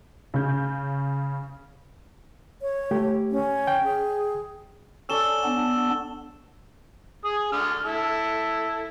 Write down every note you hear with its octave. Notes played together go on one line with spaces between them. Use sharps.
C#3 C#4 G6
C#5
A3 G4
C#4
G5
G#4
C#4 A4 D5 E6 E7 G7
B3 D4
G#4 D#6
D3 F6
E4 A4